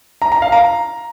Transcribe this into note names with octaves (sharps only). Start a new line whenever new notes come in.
A#5
A#5
F5
A#5